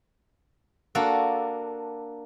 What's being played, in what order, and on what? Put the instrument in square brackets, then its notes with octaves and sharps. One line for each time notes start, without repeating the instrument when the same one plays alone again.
[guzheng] A#3 D4 F#4 A4